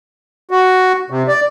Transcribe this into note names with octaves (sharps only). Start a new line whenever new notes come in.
F#4
C3
D5